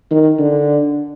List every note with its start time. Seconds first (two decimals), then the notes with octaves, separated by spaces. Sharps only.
0.11 D#3
0.39 D3